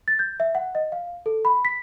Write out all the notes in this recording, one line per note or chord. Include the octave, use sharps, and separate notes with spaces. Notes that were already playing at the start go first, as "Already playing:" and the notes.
A6
G6
E5
F#5
D#5
F5
A4
B5
B6